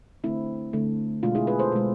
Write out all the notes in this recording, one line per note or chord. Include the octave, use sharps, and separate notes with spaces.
D3 A3 C4 E4
D3 A3
B2 G#3 D4 F4
E4 G#4
G#4 B4
A4 C5
B2 G#3